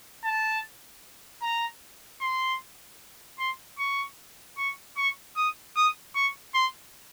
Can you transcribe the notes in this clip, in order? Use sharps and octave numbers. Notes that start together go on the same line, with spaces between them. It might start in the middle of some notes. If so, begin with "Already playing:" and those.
A5
A#5
C6
C6
C#6
C#6
C#6
D#6
D#6
C#6
C6